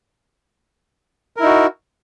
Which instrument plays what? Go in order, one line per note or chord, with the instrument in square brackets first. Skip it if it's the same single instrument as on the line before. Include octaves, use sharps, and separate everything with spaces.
[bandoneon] A#4
E4
D#4
F#4